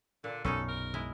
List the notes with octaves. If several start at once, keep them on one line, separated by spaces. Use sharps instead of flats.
A#2 D3
B1 F#2 C#4 D#4 G#4 A4
A#4
G#3 E4